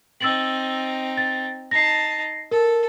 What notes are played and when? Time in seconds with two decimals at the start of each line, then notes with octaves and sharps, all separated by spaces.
0.21 C4 D#4 E6 A6 F#7
1.17 A6
1.71 D#4 A5 A#6 C7
2.51 A4 A#4